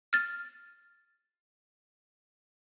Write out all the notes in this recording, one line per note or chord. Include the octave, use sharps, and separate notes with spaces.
F6 A6